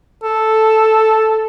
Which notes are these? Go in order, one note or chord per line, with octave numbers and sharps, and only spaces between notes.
A4